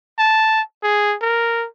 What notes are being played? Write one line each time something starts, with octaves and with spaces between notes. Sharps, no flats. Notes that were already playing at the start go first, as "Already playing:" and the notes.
A5
G#4
A#4